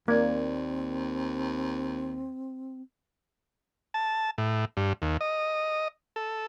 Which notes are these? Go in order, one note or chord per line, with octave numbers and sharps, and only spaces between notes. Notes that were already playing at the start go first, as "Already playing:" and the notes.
D#2 A#3 C4 D5 G#6
A5
A2
G2
D#2
D#5
A4